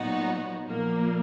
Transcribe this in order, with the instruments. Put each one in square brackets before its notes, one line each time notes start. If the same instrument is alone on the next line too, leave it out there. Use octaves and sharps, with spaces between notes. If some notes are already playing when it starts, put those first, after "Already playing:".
Already playing: [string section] A#2 F#3 B3 D#4 F#4
A#2 F3 A#3